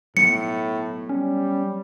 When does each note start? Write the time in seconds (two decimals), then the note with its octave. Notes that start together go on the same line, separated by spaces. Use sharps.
0.17 A2 F#3 B3 C#7
1.09 G3 C#4